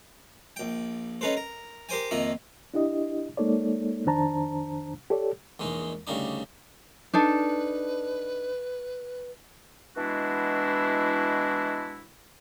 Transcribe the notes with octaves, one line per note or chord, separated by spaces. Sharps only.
A#1 G5
C#4 D#4 A4 B4 C5
A#4
G4 A#4 C5 G5 G#5
F2 A#2 D#3 D#4 E5
D4 E4 G4 D#5
G#3 A#3 D#4 A4 C#5 D5
F2 D#3 D4 C5 A5 A#5
G4 A4 C#5 D5
A#1 E2 G#3 D#4
D2 C#3 G3 D4 D#4 D6
D4 D#4 A4 B4
B2 E3 G#3 D4 E4 F#4